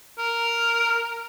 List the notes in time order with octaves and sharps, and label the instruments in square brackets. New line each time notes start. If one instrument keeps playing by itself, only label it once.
[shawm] A#4